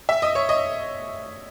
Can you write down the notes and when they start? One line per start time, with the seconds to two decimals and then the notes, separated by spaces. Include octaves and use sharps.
0.09 E5
0.22 D#5
0.35 C#5
0.49 D#5